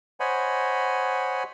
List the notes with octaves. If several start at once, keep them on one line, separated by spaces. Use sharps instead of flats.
C5 C#5 D#5 F#5 G#5 B5